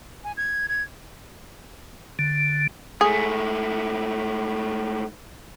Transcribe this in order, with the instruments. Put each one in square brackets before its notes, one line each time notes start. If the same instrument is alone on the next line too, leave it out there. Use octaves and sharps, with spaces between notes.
[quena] G#5
G#6
G#6
[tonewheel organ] D3
[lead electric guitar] G#2 A3 [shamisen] G#4